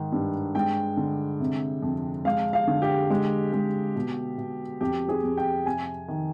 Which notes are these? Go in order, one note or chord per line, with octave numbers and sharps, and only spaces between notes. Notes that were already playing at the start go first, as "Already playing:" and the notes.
Already playing: G#2 D#3
G2
G#3 G5
D3
C3
F2
G#3 F5
F5
D3
G4
G#3
G#3
B2
B2
F2 G4
G#4
F2
G5
C3 G#5
D#3